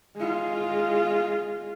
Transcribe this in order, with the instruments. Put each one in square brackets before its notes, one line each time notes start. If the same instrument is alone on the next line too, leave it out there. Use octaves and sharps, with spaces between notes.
[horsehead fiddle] G#3 F4